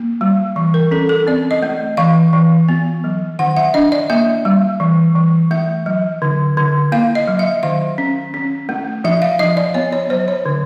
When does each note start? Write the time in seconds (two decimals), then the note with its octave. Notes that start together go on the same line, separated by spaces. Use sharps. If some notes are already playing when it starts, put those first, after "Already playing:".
Already playing: A#3
0.21 G3
0.56 E3
0.74 A#4
0.91 C#4 A4
1.09 A4
1.27 C4 D5
1.51 D#5
1.63 A3
1.97 E3 F5
2.33 E3
2.69 B3
3.04 F#3
3.39 D#3 F#5
3.57 E5
3.74 D4 D#5
3.92 D5
4.10 A#3 E5
4.45 G3
4.80 E3
5.15 E3
5.51 A3 E5
5.86 F#3
6.22 D3
6.57 D3
6.92 A#3 F5
7.15 D#5
7.28 F#3
7.39 E5
7.63 D#3 F5
7.98 C#4
8.34 C#4
8.69 A3
9.04 F3 E5
9.22 F5
9.39 F3 D#5
9.57 D5
9.74 B3 C#5
9.92 C#5
10.10 F#3 C5
10.28 C#5
10.46 D3